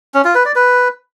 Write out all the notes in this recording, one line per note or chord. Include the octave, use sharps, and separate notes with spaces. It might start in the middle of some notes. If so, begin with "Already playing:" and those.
C#4
F4
B4
D5
B4